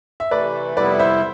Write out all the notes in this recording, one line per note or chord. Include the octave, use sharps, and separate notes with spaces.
E5
C3 E3 A3 B4 D5
F2 C3 G3 B3 E4 B4 D5
C5 E5